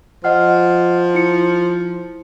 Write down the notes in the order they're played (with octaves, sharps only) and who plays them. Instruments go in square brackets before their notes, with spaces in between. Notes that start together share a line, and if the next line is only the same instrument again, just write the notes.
[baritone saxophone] F3 [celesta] D#5 F#5 F6
[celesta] E4 C#7